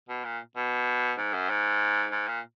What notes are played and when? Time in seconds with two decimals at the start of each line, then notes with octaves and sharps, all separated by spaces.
0.09 B2
0.25 A#2
0.57 B2
1.18 G#2
1.34 F#2
1.50 G#2
2.12 G#2
2.28 A#2